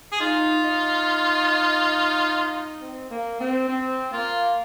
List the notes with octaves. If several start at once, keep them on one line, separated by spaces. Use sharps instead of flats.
G#4
D#4 F4
D#4
C4
A#3
C4
C4
A#3 F4